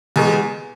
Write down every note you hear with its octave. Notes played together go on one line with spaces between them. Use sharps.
E2 B2 G#3